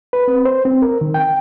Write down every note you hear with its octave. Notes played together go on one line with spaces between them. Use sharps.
B4
C4
C5
C4
A#4
D#3
G5